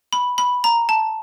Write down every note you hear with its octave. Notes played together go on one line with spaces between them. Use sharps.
B5
B5
A#5
A5